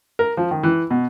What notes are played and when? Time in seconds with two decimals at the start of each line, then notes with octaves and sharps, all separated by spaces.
0.19 A#4
0.37 F3
0.51 D#3
0.63 E3
0.90 B2